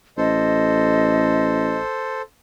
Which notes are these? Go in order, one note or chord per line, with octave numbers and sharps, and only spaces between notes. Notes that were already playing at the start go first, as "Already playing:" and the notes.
A1 A4 C5 D#5